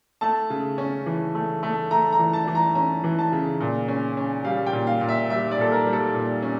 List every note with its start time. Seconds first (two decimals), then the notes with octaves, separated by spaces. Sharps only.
0.21 A3 A5
0.50 C#3
0.78 C#4
1.06 E3
1.35 A3
1.63 A3
1.91 A3 A#5
2.12 A#5
2.19 E3
2.33 A5
2.47 E3
2.55 A#5
2.75 C#4 A#5
3.04 E3
3.19 A5
3.32 C#3
3.60 A#2
3.88 C#4
4.17 C#4
4.44 G3 F5
4.66 G5
4.73 A#2
4.87 F5
5.01 A#2
5.09 E5
5.30 G3 E5
5.51 D5
5.57 A#2 A4
5.72 A#4
5.86 G3
5.93 A4
6.14 A#2
6.42 C#4